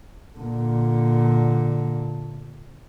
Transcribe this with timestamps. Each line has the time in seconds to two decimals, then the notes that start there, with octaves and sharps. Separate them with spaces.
0.38 A#2 D3